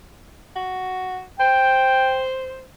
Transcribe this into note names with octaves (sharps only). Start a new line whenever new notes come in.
F#4
C5 G5